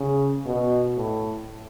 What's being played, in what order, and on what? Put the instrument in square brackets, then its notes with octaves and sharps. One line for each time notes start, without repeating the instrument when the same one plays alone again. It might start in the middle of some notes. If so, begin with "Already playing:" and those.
Already playing: [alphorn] C#3
B2
A2